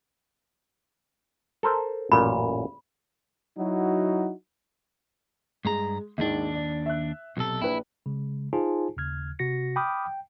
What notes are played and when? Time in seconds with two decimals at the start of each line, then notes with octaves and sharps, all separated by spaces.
1.63 A4 A#4 C5
2.12 A1 F#2 A#2 B5
3.58 F#3 D#4 E4 F#4
5.65 G2 G#3 A#5
6.18 D#2 G#2 D#3 D4
6.55 D5
6.86 E5 F#6
7.37 B1 C3 A4
7.62 A#1 E4 B4
8.06 C#3 G#3
8.53 D#4 F4 G#4 C5 G#5 A5
8.97 D#2 C#3 F6 G#6
9.39 C3 F#4 A#6 C#7
9.76 G5 B5 D6 D#6 F6 G6
10.05 G5